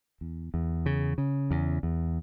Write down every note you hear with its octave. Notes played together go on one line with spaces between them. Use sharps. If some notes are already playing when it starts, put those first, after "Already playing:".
E2
E2
C#3
C#3
E2
E2